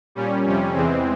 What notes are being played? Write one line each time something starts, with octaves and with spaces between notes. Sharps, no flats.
A#2 G3 C#4
F2 C3 G3 C#4
E2 E3 G#3 C4